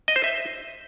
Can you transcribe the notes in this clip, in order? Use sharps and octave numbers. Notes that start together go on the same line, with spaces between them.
D#5
C5
E5